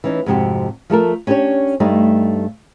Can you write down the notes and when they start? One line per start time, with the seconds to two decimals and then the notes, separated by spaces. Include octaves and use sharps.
0.04 E3 C#4 D#4
0.26 F2 G#2 C3 F#4 G4
0.90 F3 A3 A4 A#4
1.27 C#4 D4 G4 B4 C#5
1.80 G2 G3 A3 D#4